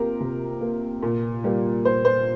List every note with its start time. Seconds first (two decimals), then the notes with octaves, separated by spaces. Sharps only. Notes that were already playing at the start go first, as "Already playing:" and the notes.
Already playing: C3 A#3 F4 G4 A#4
0.20 C3
0.61 A#3
1.03 A#2
1.44 G3 A#3
1.85 A#2 C5
2.05 C5